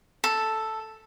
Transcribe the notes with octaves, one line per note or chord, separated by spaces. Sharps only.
A4